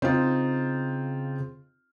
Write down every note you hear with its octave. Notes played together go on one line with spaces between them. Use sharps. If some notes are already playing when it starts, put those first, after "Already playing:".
C#3 C4 D#4 F4